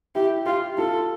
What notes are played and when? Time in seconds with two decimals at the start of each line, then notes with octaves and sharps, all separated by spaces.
0.15 E4 G4
0.46 F4 G4
0.78 F4 A4